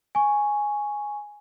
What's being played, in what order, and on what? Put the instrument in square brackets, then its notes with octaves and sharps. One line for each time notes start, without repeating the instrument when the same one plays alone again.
[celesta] G#5 C#6